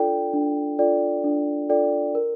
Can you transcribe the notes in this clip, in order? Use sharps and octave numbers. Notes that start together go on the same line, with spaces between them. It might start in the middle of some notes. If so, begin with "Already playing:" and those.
Already playing: D4 F4 A4 D5 G5
D4
F4 A4 D5 G5
D4
F4 A4 D5 G5
A#4